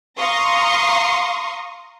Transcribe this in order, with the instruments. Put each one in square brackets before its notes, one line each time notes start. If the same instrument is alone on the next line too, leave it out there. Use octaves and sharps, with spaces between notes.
[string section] F5 A#5 C6 C#6 D#6